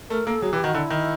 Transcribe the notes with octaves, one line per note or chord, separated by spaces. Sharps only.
A3 A#4
A#3 A4
F#3 G#4
E3 G4
D#3 F#4
D3 E4
D#3